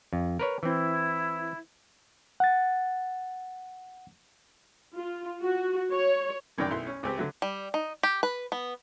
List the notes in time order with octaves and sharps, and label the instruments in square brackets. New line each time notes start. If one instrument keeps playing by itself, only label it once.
[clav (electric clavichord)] F2
A#4 B4 C#5
[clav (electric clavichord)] E3 C4 [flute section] E4
[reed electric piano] F#5 A6
[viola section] F4
F#4
C#5
[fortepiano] C2 F#2 D#3 A#4 D5 G5
B1 E4 C6
C#4
C#2 C4 G4
D3 F#3 E5
[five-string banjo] G3
D#4
G4
B4
B3